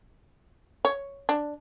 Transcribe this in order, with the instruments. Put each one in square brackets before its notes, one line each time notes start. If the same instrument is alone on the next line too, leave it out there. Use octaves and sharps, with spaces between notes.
[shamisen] C#5
D4